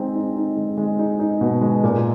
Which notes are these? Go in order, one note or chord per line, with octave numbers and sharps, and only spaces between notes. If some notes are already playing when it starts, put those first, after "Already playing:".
Already playing: G#3 C4 D#4
D#4
D#4
G#3
G#3
D#4
D#4
B2
G#3
A#2